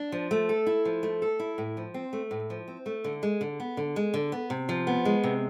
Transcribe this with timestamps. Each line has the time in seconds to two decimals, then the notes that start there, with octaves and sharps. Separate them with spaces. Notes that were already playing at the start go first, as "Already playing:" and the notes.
Already playing: D4
0.12 F3
0.31 A3
0.49 A4
0.66 E4
0.85 F3
1.03 A3
1.22 A4
1.39 E4
1.58 A2
1.77 F3
1.94 C4
2.13 A3
2.31 A2
2.50 F3
2.68 C4
2.86 A3
3.04 D3
3.23 G#3
3.41 D3
3.60 B3
3.77 D3
3.96 G#3
4.14 D3
4.32 B3
4.50 C3
4.69 F3
4.87 B3
5.05 G#3
5.24 C3